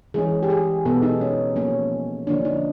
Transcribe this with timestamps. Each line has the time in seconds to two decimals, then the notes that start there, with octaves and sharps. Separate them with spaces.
0.14 E3 G#3 C#4 G#4
0.43 G4
0.50 G#4
0.85 B2 G#3 B3 A4
1.03 D#4
1.21 C#4
1.56 F3 A#3 C#4
2.27 D3 F3 A#3 C#4 D4
2.45 D#4